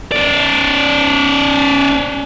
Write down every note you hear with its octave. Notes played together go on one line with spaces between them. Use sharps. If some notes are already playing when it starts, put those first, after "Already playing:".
C#4 D5